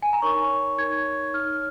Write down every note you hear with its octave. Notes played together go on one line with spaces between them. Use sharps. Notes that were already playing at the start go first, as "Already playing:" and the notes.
G#5
A#5
D#4 A#4 C#5 C#6
D#4 A#4 C#5 G#6
D#4 C#5 F6